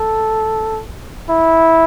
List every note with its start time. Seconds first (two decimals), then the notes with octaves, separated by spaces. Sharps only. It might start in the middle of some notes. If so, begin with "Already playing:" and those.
Already playing: A4
1.29 E4